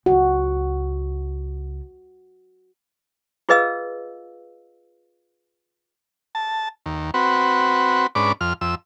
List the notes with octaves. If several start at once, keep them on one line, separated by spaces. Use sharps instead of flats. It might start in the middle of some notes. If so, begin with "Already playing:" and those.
C#2 F#4
F4 G#4 B4 D#5 F5 E6
A5
D#2
C4 F#4 B4
G#2 C#4 D4 B4 D6
F2 F6
F2 E6